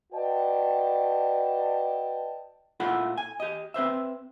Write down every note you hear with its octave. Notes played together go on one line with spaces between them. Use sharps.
F#4 B4 D5 D#5 G5 A5
A#2 E4 F4 A4 F#5 B5
G#5
G4 D#5
C4 B4 C5 E5